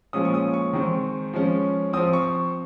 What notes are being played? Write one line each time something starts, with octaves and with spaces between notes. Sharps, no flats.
A#2 F3 G#3 C#4 D#6
C#6
D#6
C#6
D#3 G#3 C4
F3 G#3 C#4
F3 C4 D#6
C#6